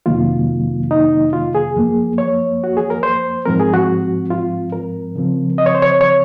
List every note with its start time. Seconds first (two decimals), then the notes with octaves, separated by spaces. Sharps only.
0.06 F2 C3 D#3 F#3 A#3 F4
0.91 D#4
1.33 F4
1.55 G#4
1.76 F#2 F3 A#3
2.18 C#5
2.64 F#4
2.77 G#4
2.90 A#4
3.03 C5
3.45 G#2 F3 C4 A#4
3.60 G#4
3.74 F#4
4.30 F4
4.73 A#4
5.16 C#3 F3 C4
5.58 D#5
5.66 C#5
5.75 C5
5.82 C#5
6.01 C#5